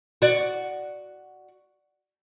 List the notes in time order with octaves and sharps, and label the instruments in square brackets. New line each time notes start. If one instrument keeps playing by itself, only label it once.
[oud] F#4 D5